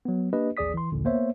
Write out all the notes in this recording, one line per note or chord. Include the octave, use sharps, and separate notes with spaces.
F#3 B3
A#3 D4 G4 B4 D#5
A1 D#2 G#4 D5 D#6 B6
E3 C6
A#1 D#2 A#2 D3
A#3 B3 C5 C#5 E5